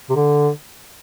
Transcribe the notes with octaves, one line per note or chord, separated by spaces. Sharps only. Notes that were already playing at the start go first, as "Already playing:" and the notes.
C3
D3